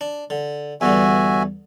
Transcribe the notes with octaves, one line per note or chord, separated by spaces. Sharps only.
D4
D3
E2 G2 D3 F#4 E5 G#5